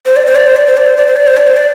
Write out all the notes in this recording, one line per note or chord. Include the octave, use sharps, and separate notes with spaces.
C5
D5
C5
D5
C5
D5
C5
D5
C5
D5
C5
D5
C5
D5
C5
D5